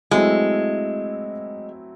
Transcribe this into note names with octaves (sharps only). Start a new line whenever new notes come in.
F#3 G#3 A3 C4 E4